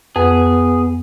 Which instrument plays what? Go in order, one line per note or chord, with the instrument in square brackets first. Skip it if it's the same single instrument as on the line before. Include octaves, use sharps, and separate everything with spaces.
[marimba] F2 [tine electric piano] B3 [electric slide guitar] G#4